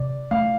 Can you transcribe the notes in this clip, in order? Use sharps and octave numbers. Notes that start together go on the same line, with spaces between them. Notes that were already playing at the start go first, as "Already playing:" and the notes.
Already playing: C3 D5
A3 F5